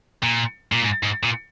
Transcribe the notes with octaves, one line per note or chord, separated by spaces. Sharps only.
A#2
A#2
G#2
G#2
A#2